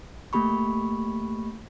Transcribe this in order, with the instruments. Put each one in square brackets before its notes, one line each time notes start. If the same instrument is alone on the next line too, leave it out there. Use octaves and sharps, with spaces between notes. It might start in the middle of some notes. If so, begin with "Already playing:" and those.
[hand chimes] A3 A#3 G4 B5 C#6